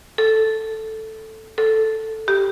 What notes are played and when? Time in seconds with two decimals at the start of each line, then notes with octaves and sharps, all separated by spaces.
0.18 A4
1.58 A4
2.28 G4